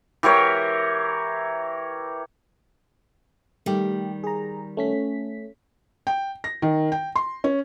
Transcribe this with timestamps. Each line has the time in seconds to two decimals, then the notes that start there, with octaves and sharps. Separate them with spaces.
0.23 E3 G4 A#4 C#5
3.66 D#3 G3 A3 G4
4.24 G#4 A#5
4.77 A3 C#4 B6
6.07 G5
6.44 A#6
6.62 D#3
6.92 G5
7.16 C6
7.44 C#4